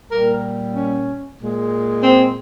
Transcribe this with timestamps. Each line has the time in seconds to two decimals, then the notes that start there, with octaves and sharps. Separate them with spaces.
0.11 A#2 G3 A#4
0.75 C#4
1.40 A#2 G#3
2.03 C4